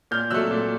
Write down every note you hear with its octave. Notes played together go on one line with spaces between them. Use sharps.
A#2 F6 G6
F#3 A3 E6 F#6
A#2